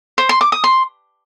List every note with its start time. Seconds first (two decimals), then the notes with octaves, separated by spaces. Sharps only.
0.18 C5
0.29 C6
0.41 D6
0.52 D#6
0.64 C6